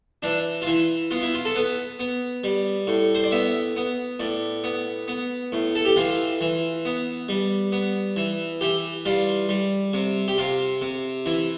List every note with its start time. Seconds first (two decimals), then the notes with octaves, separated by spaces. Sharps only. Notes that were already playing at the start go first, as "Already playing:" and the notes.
0.22 E3 D4
0.62 F4
0.67 E3 E4
1.11 B3 F4
1.22 E4
1.34 F4
1.45 A4
1.55 B3 B4
1.99 B3
2.44 G3
2.87 A2
3.15 C5
3.24 D5
3.32 B3 E5
3.76 B3
4.19 A2 D5
4.64 B3
5.08 B3
5.52 A2
5.75 A4
5.85 G4
5.96 E3 F4
6.41 E3
6.85 B3
7.28 G3
7.72 B3
8.16 E3
8.61 E3 G4
9.05 G3 F4
9.49 G3
9.93 C3
10.28 G4
10.38 C3 F4
10.81 C3
11.26 E3 E4